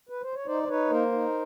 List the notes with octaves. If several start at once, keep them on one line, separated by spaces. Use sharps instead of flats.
B4
C5
C#5
D#4 C5 D5
C5
D#4 B4 C#5
A#3 A#4 C5
D#4